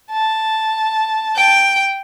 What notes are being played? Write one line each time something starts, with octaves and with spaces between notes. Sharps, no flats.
A5
G5